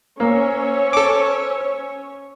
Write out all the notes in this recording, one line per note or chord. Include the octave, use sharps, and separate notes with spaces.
A#3 C#4 C5 C#5 E6
A4 D6